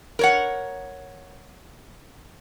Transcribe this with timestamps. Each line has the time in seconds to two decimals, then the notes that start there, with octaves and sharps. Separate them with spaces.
0.19 A#4 C#5 F#5